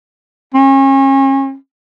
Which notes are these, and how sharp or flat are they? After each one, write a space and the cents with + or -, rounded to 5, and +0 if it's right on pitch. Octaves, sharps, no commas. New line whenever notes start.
C#4 -35